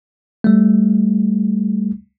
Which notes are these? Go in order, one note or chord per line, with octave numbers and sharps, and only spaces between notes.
G3 A3